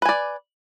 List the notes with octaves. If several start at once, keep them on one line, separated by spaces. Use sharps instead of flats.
B4 D5 G#5